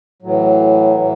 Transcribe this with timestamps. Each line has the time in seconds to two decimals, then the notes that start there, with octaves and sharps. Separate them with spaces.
0.22 A2 E3 F#3
0.96 A2 E3